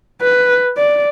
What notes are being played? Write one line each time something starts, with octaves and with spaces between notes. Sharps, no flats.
B4
D5